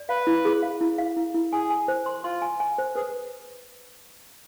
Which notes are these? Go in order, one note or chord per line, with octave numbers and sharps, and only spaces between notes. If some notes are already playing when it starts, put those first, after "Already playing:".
Already playing: D5
B4 F5
E4
G#4
F5
E4
F5
E4
E4
G#4 G#5
G#5
C5
C6
F4 C6
G#5
G#5
C5
G#4 B4